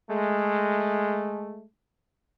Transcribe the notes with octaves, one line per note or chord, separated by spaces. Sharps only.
G#3 A3